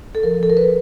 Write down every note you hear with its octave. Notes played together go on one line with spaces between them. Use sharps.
A4
F3 A#4
F3 A4
A#4
F3 B4